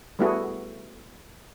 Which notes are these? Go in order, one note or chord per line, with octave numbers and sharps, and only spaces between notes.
G3 A3 B3 E4 F#4 G#4